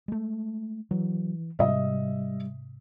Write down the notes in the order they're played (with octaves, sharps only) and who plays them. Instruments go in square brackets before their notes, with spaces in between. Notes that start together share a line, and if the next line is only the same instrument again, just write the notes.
[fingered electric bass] G#3 A3
[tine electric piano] E3 [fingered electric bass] F#3
[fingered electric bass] G#2 C3 [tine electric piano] G3 [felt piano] D#5 E5